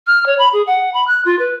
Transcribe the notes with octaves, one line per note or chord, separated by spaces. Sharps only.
F6
C#5
B5
G#4
F#5
B5
F#6
F4
B4